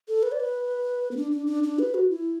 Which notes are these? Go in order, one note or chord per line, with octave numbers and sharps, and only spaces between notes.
A4
B4
D5
B4
B3
D4
D4
D4
D4
B4
F#4
E4